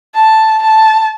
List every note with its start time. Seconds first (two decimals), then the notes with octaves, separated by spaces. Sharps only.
0.15 A5
0.62 A5